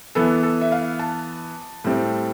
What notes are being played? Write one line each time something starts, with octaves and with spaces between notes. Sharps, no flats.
E3 B3 A4
A4
E5
F5
A5
A2 G3 C4